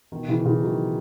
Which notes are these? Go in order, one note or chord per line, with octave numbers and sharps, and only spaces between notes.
B2 D#3
C#3 E3
C#3 E3
D#3 F#3